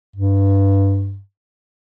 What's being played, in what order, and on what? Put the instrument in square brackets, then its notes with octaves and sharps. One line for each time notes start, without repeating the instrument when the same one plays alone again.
[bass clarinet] G2